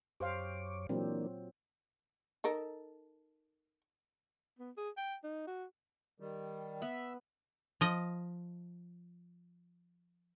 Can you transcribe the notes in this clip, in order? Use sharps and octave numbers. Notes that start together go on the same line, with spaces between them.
F#2 G4 C5 C#5 F5 D6
A#2 E3 F#3 A#3 C4 D4
D#4 A4 A#4
B3
G#4
G5
D#4
F#4
D#3 G3
B3 E5
F3 D#5